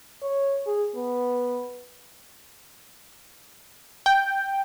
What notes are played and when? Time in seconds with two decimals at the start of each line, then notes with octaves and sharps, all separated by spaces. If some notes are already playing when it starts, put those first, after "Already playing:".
0.23 C#5
0.67 G#4
0.96 B3
4.06 G5